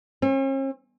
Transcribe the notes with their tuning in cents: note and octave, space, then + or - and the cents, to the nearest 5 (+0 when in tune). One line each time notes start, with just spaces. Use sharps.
C#4 -45